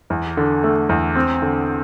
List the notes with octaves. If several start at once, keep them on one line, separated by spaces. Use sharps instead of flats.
E2
D3
A3
E2
C4
D3